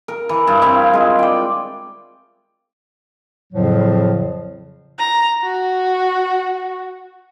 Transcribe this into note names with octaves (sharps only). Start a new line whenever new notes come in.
A#4
E3
G2
C4 E4 F5
G#3 F4
D5 G5
F2 A2 C#3 F3 F#3
A#5
F#4